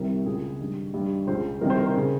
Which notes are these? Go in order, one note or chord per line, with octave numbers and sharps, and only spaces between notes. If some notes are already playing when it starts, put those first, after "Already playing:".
Already playing: C2 C3 D#3 A#4
C#2 C#3 G#4
G2 D#3
G2 D#3
C#2 C#3 C5
C2 C3 D#3 A#4
C5
A#4
C5
C#3